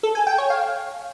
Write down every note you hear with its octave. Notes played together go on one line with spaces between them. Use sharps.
A4
G#5
G5
C#5
F5